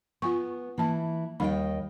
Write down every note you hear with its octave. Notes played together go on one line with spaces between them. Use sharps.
B3 F4 G#5 C#6
E3 A#3 E4 A5
D#2 G3 D#4 D#5 G5 B5